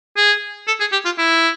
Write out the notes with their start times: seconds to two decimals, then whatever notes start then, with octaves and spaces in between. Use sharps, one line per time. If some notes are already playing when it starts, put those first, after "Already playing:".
0.17 G#4
0.68 A4
0.80 G#4
0.92 G4
1.05 F4
1.18 E4